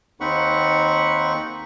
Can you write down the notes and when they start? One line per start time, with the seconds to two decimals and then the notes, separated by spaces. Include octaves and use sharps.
0.20 D#2 C4 D#4 F#5 B5 C#6